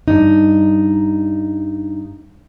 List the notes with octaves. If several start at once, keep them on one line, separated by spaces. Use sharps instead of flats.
G2 D#4